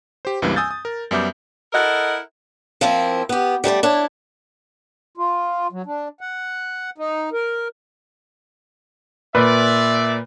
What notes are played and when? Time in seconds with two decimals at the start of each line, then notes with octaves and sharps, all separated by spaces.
0.25 G4 C5
0.42 C#2 G2 E3 G3 A#3 C4
0.56 G#5 D#6 E6 G6 A6
0.71 D#6
0.85 A#4
1.11 F#2 G3 B3 E5 D6 G6
1.72 E4 A4 A#4 D#5 F#5
2.81 F3 A#3 C4 E4
3.29 B3 G4
3.64 G3 A3 C5 D5
3.83 D4 E4 C#5
5.17 F4
5.72 F#3
5.86 D4
6.21 F#5
6.98 D#4
7.33 A#4
9.35 A#2 B4 D5 E5